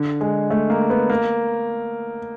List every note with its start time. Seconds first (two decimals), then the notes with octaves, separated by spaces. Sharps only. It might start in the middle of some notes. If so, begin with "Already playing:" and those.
Already playing: D3
0.21 G#3
0.50 A3
0.70 A#3
0.90 B3
1.09 A#3